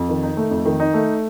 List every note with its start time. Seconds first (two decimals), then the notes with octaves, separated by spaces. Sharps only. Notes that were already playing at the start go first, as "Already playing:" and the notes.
Already playing: F2
0.09 D#3
0.23 D#4
0.37 A3
0.51 F2
0.65 D#3
0.80 D#4
0.94 A3